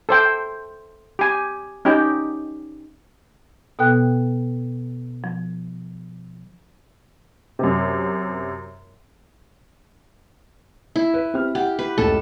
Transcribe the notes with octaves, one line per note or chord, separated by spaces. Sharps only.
A4 C5 G5
G4 G#5
C#4 D#4 G4 G5
B2 B3 A4 G5 F#6
F3
F#2 C3
E4
B4
C4 G4 F6
G4 F#5 G5
B4
F1 C#2 A4